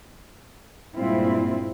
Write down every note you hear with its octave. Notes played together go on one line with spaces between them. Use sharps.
G2 A#2 G#3 C4 E4 F4